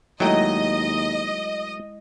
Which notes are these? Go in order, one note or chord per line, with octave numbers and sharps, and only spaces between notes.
D#2 F#3 G#3 A3 E4 D#5 G5 A#5